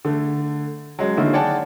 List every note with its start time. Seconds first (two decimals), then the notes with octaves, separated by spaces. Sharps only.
0.05 D3 A3
0.99 F#3 G#3 C#4
1.17 D3 D#3 F#3 A#3 D#4 E4
1.33 G#4 C#5 D5 F#5 G5 A5